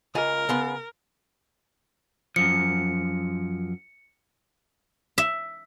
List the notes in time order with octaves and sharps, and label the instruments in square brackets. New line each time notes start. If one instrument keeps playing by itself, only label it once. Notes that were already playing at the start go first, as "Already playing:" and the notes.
[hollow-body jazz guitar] C#2 F4 G#5 [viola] A#4
[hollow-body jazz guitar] C#3 B3 C6
[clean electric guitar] F#2 F3 [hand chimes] C#7
[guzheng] E5